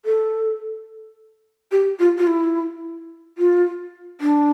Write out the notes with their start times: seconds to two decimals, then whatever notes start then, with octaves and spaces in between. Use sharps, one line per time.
0.05 A4
1.72 G4
1.99 F4
2.18 F4
2.27 E4
3.38 F4
4.21 D4